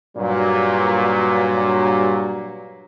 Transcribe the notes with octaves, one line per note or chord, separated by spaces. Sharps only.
G2 A#2 F#3